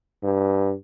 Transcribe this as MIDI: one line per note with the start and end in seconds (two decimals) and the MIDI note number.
0.23 0.74 43